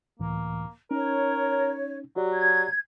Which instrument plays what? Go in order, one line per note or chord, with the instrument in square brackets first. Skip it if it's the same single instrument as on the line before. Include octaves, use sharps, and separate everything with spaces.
[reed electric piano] C#2 A2 E3 [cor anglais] A#3
[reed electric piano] C#4 D#4 [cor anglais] A#4 [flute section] C#5
[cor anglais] F#3 [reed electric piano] F#4 G4 D5
[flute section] G#6